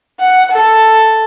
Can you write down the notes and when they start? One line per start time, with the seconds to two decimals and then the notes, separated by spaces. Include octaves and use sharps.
0.20 F#5
0.52 A4